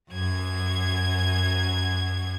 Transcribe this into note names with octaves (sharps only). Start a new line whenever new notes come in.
F#2 G#6